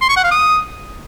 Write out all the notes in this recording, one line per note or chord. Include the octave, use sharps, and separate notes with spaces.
C6
C#6
F#5
F5
D#6